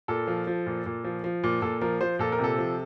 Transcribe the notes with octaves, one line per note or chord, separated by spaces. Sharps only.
A#2 A4
F3
F3
A#2
A#2
F3
F3
A#2
A#2 A4
F3 A#4
F3 C5
A#2 A4
A#4
C3 A4
F3